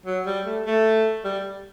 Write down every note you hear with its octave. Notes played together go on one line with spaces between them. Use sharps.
F#3
G3
A3
A3
G3